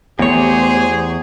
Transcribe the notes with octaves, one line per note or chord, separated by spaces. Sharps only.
E2 E3 A3 B3 G4 G#4 C5 C#5